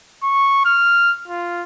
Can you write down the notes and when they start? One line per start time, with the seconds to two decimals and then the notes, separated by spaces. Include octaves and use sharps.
0.23 C#6
0.65 F6
1.28 F4